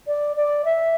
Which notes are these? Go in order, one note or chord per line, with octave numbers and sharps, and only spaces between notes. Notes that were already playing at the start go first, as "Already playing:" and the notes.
D5
D5
E5